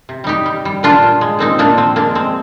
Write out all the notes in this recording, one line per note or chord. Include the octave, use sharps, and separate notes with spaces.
C3
G3 D#4 G4
G3
G3
A#2 D4 F4
A#2
G#3
A#2 C4 D#4
A#2 A#3 D4
F3 C4
G#3 A#3 D4
G#3 C4